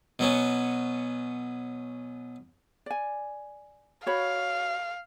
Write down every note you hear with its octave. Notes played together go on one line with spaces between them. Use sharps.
B2 F#3 B3 C#4
D5 G#5
F#4 C#5 F5 B5